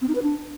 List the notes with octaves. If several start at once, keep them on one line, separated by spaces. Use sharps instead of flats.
C4
D#4
B4
D4